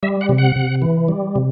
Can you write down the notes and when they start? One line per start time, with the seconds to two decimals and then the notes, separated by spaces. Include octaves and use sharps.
0.03 G3 E5
0.21 F#5
0.29 C3
0.38 F#5
0.56 C3
0.82 E3
1.08 G3
1.36 C3